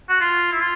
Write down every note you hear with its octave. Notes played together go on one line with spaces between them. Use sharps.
F#4
F4
E4
F4